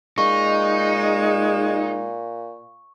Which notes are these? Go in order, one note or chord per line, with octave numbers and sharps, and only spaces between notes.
A#2 G#3 D#4 C#6